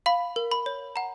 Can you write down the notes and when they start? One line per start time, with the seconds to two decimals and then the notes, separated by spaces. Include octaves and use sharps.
0.06 F5 B5
0.36 A#4
0.52 B5
0.66 C#5
0.96 F#5 A#5